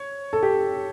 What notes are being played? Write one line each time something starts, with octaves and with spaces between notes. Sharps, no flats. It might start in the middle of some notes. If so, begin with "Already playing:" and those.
Already playing: C#5
A4
G4